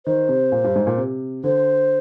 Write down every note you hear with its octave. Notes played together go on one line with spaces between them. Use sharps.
D#3 C5
C3
A#2
G2
G#2
A#2
C3
D3 C5